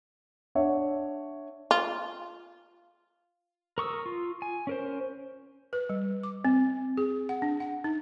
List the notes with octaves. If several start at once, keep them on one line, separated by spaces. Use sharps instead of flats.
D4 C#5 E5 F#5
F4
A#4 C#6 D#6 E6
F4
G#5
C#4 A#4 C5
B4
G3
D6
C4
G#4
F#5
D4
F#5
D#4